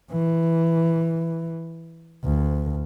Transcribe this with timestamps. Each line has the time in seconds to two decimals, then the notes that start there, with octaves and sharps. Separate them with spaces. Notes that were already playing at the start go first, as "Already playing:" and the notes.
0.11 E3
2.24 D2